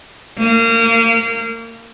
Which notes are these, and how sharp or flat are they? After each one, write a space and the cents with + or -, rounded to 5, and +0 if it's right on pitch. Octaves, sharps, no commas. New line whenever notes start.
A#3 -30